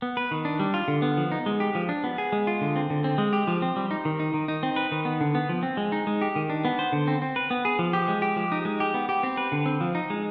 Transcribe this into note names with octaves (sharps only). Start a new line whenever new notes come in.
B3
B4
D#3
D4
G3
F4
D3
B3
F3
D#4
G#3
G4
F3
D4
B3
G#4
G#3
F4
D3
C4
D3
C4
G#3
G4
F3
C4
G3
D#4
D#3
D#4
D#3
D#4
C4
B4
D#3
B3
D3
B3
F3
C4
G#3
D#4
G#3
G4
D#3
D4
B3
C5
D3
C4
C4
B4
B3
G#4
F3
G4
G#3
G4
F3
D#4
G#3
G4
B3
G4
C4
B4
D3
C4
F3
D#4
G#3